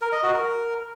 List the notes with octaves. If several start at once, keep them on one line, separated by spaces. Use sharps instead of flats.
A#4
D#5
F#4
A#4